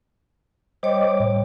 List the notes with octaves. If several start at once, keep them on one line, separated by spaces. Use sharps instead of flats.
G3 C5 C#5 D#5 G5 D6
A2